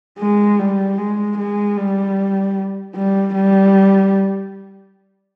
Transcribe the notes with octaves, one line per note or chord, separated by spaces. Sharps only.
G#3
G3
G#3
G#3
G3
G3
G3